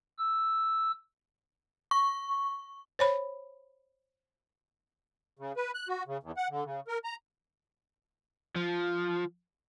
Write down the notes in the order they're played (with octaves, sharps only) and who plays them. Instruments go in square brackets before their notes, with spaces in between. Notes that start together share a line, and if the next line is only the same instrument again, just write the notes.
[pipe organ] E6
[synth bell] C#6
[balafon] C5 C#5 B5
[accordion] C#3
B4
F#6
F#4
C#3
E2
F#5
D3
C#3
A#4
A#5
[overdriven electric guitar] F3